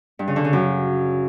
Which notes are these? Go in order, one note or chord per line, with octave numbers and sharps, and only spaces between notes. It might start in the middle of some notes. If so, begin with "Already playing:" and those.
G2
C#3
D3
C#3
F#2